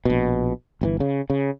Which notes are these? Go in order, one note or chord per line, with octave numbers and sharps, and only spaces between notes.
A#1 B2
G1 B2 E3
C#3
C#3